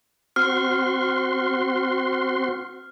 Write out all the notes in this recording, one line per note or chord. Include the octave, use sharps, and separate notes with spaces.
C4 F#4 C6 F6